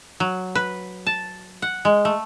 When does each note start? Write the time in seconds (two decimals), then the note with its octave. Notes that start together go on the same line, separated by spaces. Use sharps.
0.20 F#3
0.55 B4
1.07 A5
1.62 F#5
1.85 G#3
2.05 A3